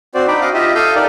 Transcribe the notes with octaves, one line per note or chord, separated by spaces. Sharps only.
C4 F#4 C5 D5
D4 D#4 D5 G5 B5
D#5 F5 F#5 D6
F4 G4 D#5 E5
A4 F5 D#6 E6 G6
D#4 G4 A4 A#4 D5